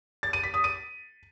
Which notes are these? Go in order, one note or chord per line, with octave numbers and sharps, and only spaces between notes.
A6
D#7
B6
D#6
D#7